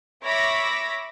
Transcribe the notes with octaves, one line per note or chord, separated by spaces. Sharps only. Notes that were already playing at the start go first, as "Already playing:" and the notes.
C#5 E5 B5 D6 A#6 B6